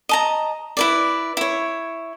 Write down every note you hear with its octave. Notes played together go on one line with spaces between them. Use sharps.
D#5 A5 A#5
E4 B4 D5
E4 C#5